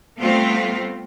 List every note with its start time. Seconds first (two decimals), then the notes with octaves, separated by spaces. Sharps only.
0.19 G3 A3 B3 C4 F4